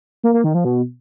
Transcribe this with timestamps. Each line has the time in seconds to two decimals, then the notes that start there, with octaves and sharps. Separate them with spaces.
0.24 A#3
0.34 A#3
0.44 D#3
0.54 F3
0.65 B2